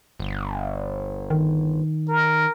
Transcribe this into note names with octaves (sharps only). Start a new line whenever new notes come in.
G1
D#3
A#4